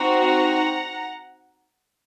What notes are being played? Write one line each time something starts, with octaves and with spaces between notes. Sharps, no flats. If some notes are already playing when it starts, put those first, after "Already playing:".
Already playing: C4 D#4 F#4 F#5 A#5